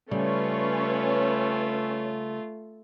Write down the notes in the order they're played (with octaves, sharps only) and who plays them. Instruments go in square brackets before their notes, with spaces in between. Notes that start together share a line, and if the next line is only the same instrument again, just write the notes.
[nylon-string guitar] C#3 G3 [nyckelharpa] A3 F4 [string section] C#4 B4 C#5